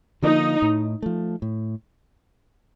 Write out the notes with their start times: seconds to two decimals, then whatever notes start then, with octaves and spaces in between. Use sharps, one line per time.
0.22 D3 F3 A#3 D#4
0.62 A2
1.02 F3 A3
1.42 A2